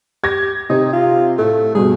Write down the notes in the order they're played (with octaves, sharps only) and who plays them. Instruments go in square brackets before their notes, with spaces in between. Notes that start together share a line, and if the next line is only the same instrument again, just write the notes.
[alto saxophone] G4 [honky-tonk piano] G#6 A#6
[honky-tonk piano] C3 C4 [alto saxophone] D#4
[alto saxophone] F4
[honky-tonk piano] A2 [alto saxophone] A3
[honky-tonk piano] G2 B2 [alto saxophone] G#4